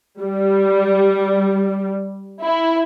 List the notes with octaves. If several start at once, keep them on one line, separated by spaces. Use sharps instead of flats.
G3
E4